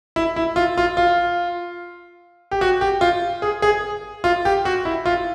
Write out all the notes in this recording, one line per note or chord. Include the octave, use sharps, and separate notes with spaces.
E4
E4
F4
F4
F4
G4
F#4
G4
F4
G#4
G#4
F4
G4
F#4
E4
F4